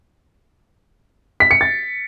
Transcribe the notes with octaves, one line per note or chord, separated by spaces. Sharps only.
B6
C#7
A6